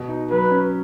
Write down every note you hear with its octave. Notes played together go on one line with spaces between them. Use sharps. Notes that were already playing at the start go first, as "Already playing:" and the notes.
Already playing: B2
D#4
F#3 B4
C#4